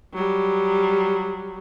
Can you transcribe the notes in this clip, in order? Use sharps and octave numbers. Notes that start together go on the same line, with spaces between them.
F#3 G3